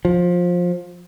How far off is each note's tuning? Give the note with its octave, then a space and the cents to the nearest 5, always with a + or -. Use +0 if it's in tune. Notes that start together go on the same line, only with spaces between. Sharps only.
F3 +20